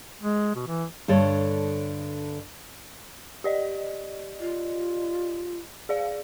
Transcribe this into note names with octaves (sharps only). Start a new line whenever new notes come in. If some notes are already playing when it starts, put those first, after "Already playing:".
G#3
B2
E3
G2 D3 A4 C#5
G4 D5 D#5
F4
G#4 D5 F5